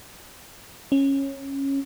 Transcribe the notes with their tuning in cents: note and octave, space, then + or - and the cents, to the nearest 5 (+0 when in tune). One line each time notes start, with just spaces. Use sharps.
C#4 -15